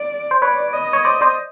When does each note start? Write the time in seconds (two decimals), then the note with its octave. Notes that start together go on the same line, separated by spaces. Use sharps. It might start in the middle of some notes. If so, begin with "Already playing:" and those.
Already playing: D5
0.31 C5
0.42 B4 C#5 D5
0.73 D#5
0.93 C#5
1.05 C5 D5
1.21 C5 D5